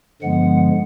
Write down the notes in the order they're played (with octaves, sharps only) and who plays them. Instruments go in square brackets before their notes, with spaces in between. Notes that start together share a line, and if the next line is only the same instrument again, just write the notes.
[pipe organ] G2 D3 F3 G#3 B3 F#5